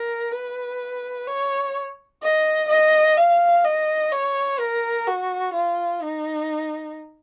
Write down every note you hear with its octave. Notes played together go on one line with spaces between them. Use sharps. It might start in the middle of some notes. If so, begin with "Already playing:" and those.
Already playing: A#4
B4
C#5
D#5
D#5
F5
D#5
C#5
A#4
F#4
F4
D#4